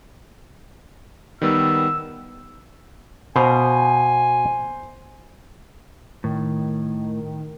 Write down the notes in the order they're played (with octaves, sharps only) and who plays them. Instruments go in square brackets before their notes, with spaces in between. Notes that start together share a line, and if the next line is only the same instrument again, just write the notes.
[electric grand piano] D#3 G3 B3 [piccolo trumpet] E6
[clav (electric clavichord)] B2 F5 [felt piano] C5 [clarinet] G#5
[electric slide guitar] A2 [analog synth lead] D#3